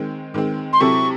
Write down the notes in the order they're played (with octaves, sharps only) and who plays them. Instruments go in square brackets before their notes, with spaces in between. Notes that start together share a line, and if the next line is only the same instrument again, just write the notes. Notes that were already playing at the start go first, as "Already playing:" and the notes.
Already playing: [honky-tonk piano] D#3 G#3 C4
D#3 G#3 C4
[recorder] C6
[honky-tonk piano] C3 F#3 C4 E4 A4 [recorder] C#6